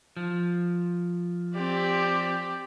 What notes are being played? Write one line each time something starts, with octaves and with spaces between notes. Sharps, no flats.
F3
C4 G4 D5